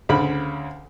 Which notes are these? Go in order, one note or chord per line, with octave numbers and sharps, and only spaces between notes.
D2 C#3 B5